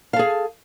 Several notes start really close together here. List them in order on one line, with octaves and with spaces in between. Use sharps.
F5 A4 G#4